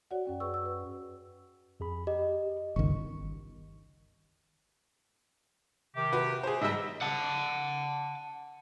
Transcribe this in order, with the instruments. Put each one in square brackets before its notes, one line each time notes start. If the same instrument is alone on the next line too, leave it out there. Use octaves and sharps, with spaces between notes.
[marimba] F#4 C#5 D5 F#5
F#2 C#4 G5
G#4 B4 C#6 E6
E6
B4
[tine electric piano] F2 G#4 B5
[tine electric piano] G4 [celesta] D#5
[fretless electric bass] G1 C#2 D#3 [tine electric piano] C#6
[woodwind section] C3 D#3 G4
[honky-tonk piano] F#4 B4
G#4 C5
[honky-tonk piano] G#2 G3 [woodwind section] D#5 E5
[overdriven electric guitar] F#5 A5